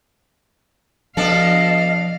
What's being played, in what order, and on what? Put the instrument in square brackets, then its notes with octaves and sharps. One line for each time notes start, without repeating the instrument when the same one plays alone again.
[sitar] B2 D4 A4 [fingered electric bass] F3 [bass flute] D#5 [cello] F5